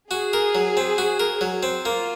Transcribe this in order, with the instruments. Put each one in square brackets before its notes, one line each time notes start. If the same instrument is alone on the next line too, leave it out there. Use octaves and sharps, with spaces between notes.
[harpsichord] F#4 [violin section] G#4
[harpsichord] A#4
F#3
C4
F#4
A#4
F#3
C4
[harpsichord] A#3 [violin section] F4